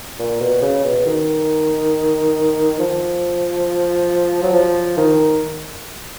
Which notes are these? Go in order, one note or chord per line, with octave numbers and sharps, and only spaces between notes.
A#2
B2
C#3
B2
D#3
F3
F#3
F3
D#3